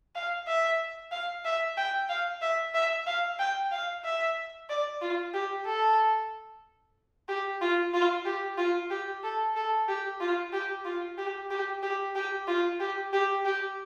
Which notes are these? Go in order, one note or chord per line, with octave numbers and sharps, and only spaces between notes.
F5
E5
F5
E5
G5
F5
E5
E5
F5
G5
F5
E5
D5
F4
G4
A4
G4
F4
F4
G4
F4
G4
A4
A4
G4
F4
G4
F4
G4
G4
G4
G4
F4
G4
G4
G4